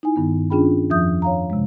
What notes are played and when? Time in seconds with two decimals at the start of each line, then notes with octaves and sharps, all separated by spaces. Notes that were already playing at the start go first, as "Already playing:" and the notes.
0.03 D#4 E4 G#5
0.16 G2 D#3 B3
0.50 C#4 D4 F4 G#4 G5 B5
0.90 F2 F3 E5 D#6 G6
1.22 C#5 F5 A#5
1.50 C3 G#3